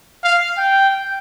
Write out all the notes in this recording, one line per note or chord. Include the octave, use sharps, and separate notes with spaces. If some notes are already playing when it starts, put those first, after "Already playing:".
F5
G5